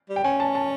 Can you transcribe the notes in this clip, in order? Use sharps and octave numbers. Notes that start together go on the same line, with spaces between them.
G3
G5
C#4 G#5
A5
A5